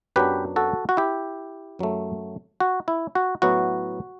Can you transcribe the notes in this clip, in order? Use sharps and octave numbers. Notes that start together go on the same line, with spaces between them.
F#2 F#3 B3 D4 G4 B4
F#4 A4
F#4
E4 G4
F#2 F#3 A3
F#4
E4
F#4
A2 F#3 B3 E4 F#4